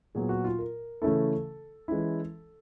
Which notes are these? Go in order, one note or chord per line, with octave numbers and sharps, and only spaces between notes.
A#2 F#3 B3 G#4
F#4
F4
A#4
C#3 E3 A3 C#4 E4 A4
E3 G#3 C#4 E4